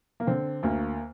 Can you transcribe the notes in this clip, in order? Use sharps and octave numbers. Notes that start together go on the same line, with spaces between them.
A#3
D3 C4
D2 A#3